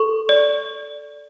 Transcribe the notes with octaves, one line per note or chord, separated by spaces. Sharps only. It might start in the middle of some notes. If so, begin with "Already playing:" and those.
Already playing: A4 C#6
D5